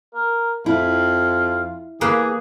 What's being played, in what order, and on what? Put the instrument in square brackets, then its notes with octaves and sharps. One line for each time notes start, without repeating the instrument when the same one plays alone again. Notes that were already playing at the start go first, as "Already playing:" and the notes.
[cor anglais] A#4
[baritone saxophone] F2 [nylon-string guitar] E4 [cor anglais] F4
[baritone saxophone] E3 [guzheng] A#3 B4 [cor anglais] G#4